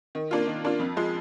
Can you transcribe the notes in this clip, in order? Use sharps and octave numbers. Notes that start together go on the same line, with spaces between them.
D#3
A#3 D4 F4
D#3
A#3 D4 F4
F2
F3 G#3